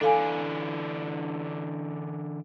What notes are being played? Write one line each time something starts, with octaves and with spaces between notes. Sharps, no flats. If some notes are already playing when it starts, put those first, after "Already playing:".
D3 E3 D4 A4 F5 G#5